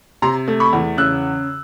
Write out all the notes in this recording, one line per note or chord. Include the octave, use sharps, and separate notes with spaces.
C3 A#5 C6
A3
B5 C#6
E2
C#3 E6 F#6